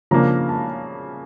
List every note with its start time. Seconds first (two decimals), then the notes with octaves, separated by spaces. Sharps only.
0.11 C#3 F3 A#3 D4 A#5
0.49 A5